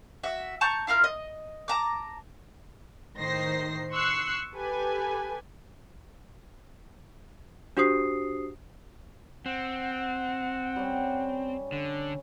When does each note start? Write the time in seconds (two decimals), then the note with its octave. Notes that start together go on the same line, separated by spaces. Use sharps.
0.23 F#4 E5
0.61 A5 A#5 C#6 G6
0.87 E4 F4 A#4 F6
1.04 D#5
1.68 A5 A#5 D6
3.18 A2 D#3 D#4 C5 A#6 C7
3.92 C6 C#6 E6 F#6 C7
4.54 G4 A4 B4 G#5
7.77 D4 F#4 G4 C5 D#6 C7
9.46 C4 F#5
10.76 G3 C#4
11.72 D3